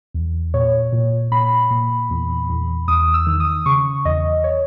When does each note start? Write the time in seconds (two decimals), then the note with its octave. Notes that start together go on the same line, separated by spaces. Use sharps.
0.14 E2
0.54 A#2 C#5
0.93 A#2
1.32 A#2 B5
1.71 A#2
2.10 E2
2.49 E2
2.88 E2 D#6
3.14 E6
3.27 D#3
3.40 D#6
3.66 C#3 C#6
4.05 E2 D#5
4.44 C#5